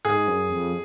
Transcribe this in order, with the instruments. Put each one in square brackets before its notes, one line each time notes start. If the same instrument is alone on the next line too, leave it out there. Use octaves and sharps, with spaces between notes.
[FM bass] G#2 [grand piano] G#4
[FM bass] F#2
F2